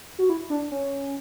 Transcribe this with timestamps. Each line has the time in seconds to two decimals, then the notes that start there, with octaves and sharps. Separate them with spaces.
0.19 F#4
0.30 E4
0.50 D4
0.71 C#4